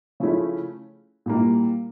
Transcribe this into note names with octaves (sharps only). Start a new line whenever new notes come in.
C#3 F3 A3 C#4 E4
A#2 G3 A#3 E4